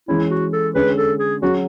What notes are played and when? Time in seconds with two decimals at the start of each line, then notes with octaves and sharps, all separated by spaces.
0.08 E3 G#3 C#4 E4
0.30 F#4
0.53 A4
0.75 D3 G#3 C#4 G#4 B4
0.97 A4
1.20 G#4
1.42 F#3 C#4 F#4 G#4